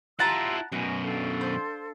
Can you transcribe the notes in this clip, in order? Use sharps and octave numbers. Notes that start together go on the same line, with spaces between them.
E4 F4 G4 F#5 A5 A#5 C6 E6
F#2 B2 F#4 G#5
D4 A4 F5
C5